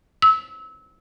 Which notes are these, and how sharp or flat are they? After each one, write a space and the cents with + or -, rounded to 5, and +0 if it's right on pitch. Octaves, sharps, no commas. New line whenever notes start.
E6 -25